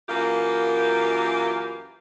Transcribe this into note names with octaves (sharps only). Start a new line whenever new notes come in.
F#2 E3 A#3 F4 G4